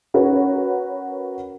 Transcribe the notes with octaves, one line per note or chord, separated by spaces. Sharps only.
C#4 F#4 A#4 B4 C#5